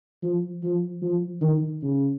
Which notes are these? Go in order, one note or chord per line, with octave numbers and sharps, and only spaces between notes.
F3
F3
F3
D#3
C#3